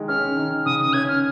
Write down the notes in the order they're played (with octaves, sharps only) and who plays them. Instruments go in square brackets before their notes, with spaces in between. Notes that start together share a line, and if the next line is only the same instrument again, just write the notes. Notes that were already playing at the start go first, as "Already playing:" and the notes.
Already playing: [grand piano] D#3 G#3
[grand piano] C#4 [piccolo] F6
[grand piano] D#3
[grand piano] C#3 [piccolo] D#6
[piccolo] D#6
[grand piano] C#4 [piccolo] G#6
[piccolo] F6